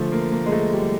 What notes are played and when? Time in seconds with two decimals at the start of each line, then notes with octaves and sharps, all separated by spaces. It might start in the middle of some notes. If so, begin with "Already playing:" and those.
Already playing: D3 F3 A3
0.12 A#3
0.32 A#3
0.46 G#3
0.52 A3
0.73 G3